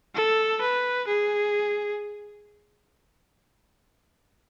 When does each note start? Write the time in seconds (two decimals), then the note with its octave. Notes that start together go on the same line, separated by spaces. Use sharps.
0.15 A4
0.61 B4
1.07 G#4